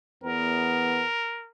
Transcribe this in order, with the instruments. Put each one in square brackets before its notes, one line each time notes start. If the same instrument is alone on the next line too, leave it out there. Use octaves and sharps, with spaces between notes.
[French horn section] E2 B3 [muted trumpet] A#4